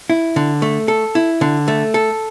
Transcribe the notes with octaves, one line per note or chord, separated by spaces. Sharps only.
E4
D3
A3
A4
E4
D3
A3
A4